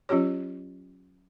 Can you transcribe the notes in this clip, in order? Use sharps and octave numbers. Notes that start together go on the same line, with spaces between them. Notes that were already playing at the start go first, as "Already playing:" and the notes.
F#3 C#4 F4 G4 C#5